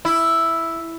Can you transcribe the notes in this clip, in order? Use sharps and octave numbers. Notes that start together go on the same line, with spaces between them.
E4